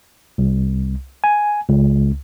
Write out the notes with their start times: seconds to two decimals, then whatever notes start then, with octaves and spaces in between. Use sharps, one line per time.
0.38 C2
1.24 G#5
1.69 C#2